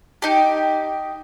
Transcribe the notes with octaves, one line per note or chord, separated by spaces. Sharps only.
D#4 G4